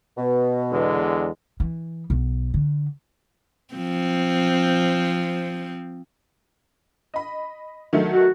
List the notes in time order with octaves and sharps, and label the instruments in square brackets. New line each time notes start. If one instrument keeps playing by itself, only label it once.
[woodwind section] B2
[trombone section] E2 D3 G#3
[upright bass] E3
B1
D3
[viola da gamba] F3 C4
[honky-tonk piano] D#5 B5
D#3 F#3 A3
[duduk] F#4